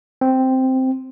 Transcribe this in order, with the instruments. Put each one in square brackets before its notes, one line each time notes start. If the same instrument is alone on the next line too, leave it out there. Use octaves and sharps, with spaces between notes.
[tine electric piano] C4